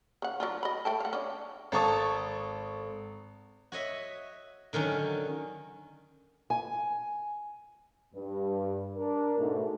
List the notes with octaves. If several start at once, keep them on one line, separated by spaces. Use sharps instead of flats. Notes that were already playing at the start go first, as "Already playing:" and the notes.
C#3 F#5
F#3 D4 F4
D#5 B5
A3 G5 A5
F5 F#5
C#4 D4
G#1 A4 A5 C#6 D#6
F#4 C#5 D#5 E5
D3 D#3 F#3 C#4
G#5
G2
D4 A#4
G#2 B2 A3